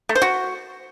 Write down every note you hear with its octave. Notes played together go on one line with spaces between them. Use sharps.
A3
C5
F#4